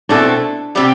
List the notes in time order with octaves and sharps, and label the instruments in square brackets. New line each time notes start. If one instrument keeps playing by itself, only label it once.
[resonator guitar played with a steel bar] B2 A3 C4 E4 A4 [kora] D4
[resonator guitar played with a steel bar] C3 G3 C4 G4